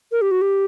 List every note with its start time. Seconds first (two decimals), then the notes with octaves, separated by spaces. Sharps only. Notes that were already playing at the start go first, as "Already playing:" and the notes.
0.12 A#4
0.21 G4
0.31 F#4
0.41 G4